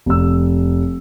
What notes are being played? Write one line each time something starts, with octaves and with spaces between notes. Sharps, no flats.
F1 E6